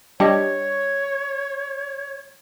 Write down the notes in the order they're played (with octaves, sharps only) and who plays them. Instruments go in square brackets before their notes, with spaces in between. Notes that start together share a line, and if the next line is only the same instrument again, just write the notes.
[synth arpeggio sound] G3 [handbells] D4 G4 D#5 [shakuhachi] C#5